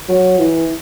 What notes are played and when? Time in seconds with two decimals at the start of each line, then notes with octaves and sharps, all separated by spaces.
0.09 F#3
0.39 E3